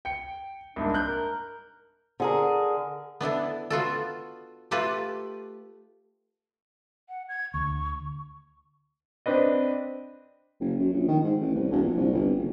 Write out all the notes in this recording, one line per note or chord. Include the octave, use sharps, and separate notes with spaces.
G5 C#7
C2 G#2 A#3 D4
F#6 G6
A#4
D3 G#4 A#4
B3 D4 E4 A4
B3 F4 F#4 A4
A3 F4 G4 A4 B4
F#5
G#6
D2 C#6
C4 D4 B4 D#5
F#1
F#2
A#1
D#3
G#2
A1
C2
E1
A#1
C2
G1
F#1